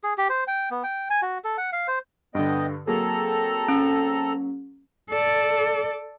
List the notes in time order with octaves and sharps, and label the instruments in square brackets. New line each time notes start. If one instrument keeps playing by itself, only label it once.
[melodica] G#4
G4
C5
G5
B3
G5
G#5
F#4
A4
F#5
F5
C5
[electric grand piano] G2 D3 [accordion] B3 D#5 G5
[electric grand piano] F#3 A#3 G#4 [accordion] C4 A4 A#5
[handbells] C#4
[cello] A4 D5